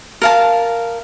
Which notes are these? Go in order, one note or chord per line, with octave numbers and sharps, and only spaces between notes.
A#4 F5 A5